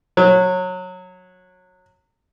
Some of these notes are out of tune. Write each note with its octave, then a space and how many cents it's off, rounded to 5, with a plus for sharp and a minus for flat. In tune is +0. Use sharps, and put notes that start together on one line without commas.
F#3 -20